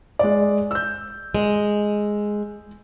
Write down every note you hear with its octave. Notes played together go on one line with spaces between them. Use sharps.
G#3 D5
E6 G6
G#3